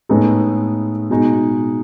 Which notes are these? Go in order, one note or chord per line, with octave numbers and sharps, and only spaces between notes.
A2 G#3 B3 D#4 A4
B2 G#3 D#4